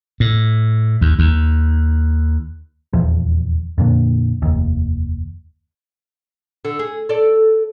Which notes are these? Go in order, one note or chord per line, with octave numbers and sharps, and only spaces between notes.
A2
D#2
D#2
D#1 E2 F3
F2 A#2 D3
F1 D#2
D3
G#4
A4 D5